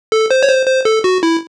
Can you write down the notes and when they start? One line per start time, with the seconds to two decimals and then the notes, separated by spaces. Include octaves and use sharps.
0.12 A4
0.31 C5
0.43 C#5
0.49 C5
0.67 C5
0.85 A4
1.04 F#4
1.23 E4